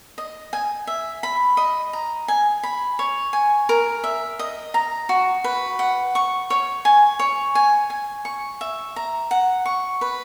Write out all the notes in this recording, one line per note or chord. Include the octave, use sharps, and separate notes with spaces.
D#5
G#5
E5
B5
D#5
A#5
G#5
B5
C#5
G#5
A#4
E5
D#5
A#5
F#4
B4
F#5
C#6
C#5
G#5
C#5
G#5
G#5
C#6
E5
A#5
F#5
C#6
B4